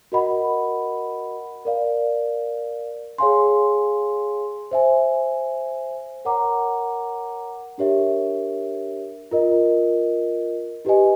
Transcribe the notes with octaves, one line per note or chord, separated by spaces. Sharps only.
F#4 A#4 D#5 F#5 B5
A#4 D5 F5
G#4 C#5 F5 G#5 C6
C5 E5 G#5
A#4 C#5 F#5 A#5 D6
D4 G4 A#4 C#5 E5
F4 A#4 D#5
E4 G4 B4 D#5 G#5